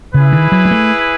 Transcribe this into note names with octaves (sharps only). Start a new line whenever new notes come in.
C#3 E4 G#4 B4
D#3
F#3
G#3
A3